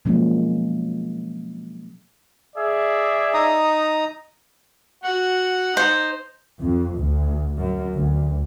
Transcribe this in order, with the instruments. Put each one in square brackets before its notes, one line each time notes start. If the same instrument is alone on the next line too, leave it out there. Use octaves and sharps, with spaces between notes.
[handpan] B2 F3 F#3 G#3 A#3 C#4
[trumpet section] G#4 D5 E5
[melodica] D#4 A#5 D#6
[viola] F#4 [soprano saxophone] F#5
[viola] D#4 [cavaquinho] C5
[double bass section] F2
D2
F#2
D2